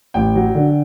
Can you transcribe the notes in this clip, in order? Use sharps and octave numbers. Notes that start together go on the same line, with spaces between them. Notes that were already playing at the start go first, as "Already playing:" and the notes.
A1 G5
F#3
D3